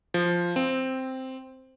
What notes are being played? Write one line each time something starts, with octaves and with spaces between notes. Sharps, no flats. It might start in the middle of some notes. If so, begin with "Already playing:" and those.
F3
C4